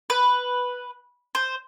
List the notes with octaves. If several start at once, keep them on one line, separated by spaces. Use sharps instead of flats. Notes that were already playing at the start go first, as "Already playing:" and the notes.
B4
C5